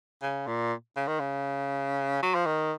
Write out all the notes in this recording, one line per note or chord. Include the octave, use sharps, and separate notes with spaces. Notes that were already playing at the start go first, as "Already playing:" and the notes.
C#3
A#2
C#3
D#3
C#3
F#3
F3
D#3